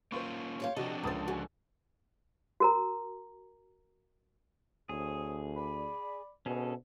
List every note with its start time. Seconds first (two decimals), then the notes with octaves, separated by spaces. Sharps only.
0.12 A#3 C#4 F4 C5 C6 C#6
0.60 G4 C#5 F5
0.77 C3 F3 D4 F#4 A4 D#5
1.03 C#2 C#3 A#4 C5 A5 D#6 A6
1.28 D3 F#4 G#5
2.60 F#4 A#4 A#5
4.89 D2 C4 G#4 C#5 D#6
5.57 D5 B5
6.46 D2 B2 C#4 G#4 A4